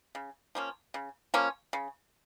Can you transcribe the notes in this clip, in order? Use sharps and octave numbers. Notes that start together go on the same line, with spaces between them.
C#3
F3 A#3 C#4
C#3
F3 A#3 C#4
C#3